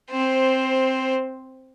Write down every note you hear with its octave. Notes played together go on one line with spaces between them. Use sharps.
C4 C5